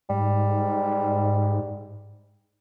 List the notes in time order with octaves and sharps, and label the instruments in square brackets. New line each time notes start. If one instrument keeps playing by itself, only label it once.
[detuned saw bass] G#2 [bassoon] G3